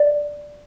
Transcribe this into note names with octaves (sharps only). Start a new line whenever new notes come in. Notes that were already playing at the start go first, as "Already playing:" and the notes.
Already playing: D5